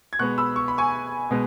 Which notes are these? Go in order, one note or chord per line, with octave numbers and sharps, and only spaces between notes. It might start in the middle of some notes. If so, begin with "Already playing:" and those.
G#6
B2 G#3 B3 C#6 F#6
B5 E6
C#6
B5
G#5 C#6
B2 G#3 B3